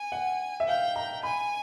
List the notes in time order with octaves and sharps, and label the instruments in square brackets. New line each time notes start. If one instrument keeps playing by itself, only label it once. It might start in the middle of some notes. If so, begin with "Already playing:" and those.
Already playing: [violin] G#5
[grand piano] F#5
E5
[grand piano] F5 [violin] G5
[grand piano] A#5
[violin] G#5 [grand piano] B5